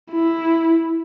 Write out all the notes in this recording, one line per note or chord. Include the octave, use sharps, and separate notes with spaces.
E4